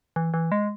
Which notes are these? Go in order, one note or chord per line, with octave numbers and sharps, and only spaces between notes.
E3
E3
G#3